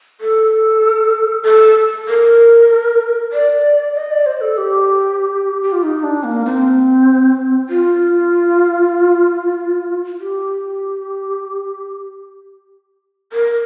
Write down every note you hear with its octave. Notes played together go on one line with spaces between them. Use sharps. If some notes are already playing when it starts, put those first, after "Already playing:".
A4
A4
A#4
D5
D#5
D5
C5
A4
G4
G4
F4
D#4
D4
A#3
C4
F4
G4
A#4